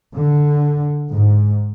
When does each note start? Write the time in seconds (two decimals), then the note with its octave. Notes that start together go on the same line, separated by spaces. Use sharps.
0.16 D3
1.11 G#2